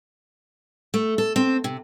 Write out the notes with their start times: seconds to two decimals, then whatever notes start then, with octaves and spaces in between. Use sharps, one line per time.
0.94 A3
1.18 A4
1.36 C4
1.64 C3